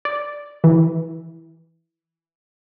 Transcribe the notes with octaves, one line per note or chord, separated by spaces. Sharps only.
D5
E3